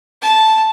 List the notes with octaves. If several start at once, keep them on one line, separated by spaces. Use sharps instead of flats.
A5